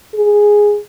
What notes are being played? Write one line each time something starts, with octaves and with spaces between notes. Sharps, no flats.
G#4